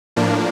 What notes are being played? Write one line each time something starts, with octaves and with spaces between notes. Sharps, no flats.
A2 F3 A#3 D4